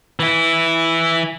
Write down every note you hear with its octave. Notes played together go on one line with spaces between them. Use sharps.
E3 E4